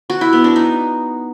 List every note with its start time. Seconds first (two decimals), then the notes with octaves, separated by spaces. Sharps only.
0.10 F#4
0.21 E4
0.33 B3
0.44 D4
0.56 D#4